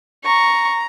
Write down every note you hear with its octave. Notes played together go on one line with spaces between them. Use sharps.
A#5 C#6